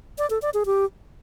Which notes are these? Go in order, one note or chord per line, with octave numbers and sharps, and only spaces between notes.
D5
A4
D5
G#4
G4